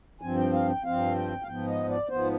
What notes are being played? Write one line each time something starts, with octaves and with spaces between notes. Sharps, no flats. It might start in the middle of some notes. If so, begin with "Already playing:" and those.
G2 F3 C4 G#5
G5
F5
G5
G2 F3 C4 F5
G5
F5
G#2 F3 B3 G5
D#5
D5
G#2 F3 B3 C5